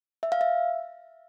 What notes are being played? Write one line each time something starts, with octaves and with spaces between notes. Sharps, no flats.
E5
F5
E5